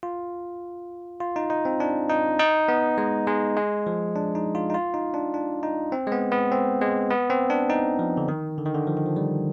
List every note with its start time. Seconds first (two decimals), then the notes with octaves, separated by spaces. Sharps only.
0.03 F4
1.21 F4
1.36 D#4
1.50 D#4
1.65 C4
1.80 D4
2.10 D#4
2.39 D#4
2.68 B3
2.98 G#3
3.27 G#3
3.57 G#3
3.87 F3
4.16 D4
4.35 D#4
4.55 F4
4.70 D#4
4.74 F4
4.94 D#4
5.14 D4
5.34 D4
5.63 D#4
5.92 C4
6.07 G#3
6.12 B3
6.32 B3
6.52 C4
6.81 G#3
7.10 B3
7.30 C4
7.50 D4
7.70 D#4
7.99 F3
8.17 D3
8.28 D#3
8.58 D3
8.66 D#3
8.74 D3
8.87 F3
8.97 D#3
9.06 F3
9.16 G3